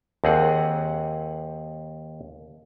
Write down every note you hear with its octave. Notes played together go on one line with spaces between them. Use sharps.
D#2 C4 G#4 F#5